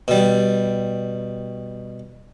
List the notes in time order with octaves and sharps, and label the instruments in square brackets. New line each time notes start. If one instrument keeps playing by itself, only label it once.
[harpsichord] B2 G3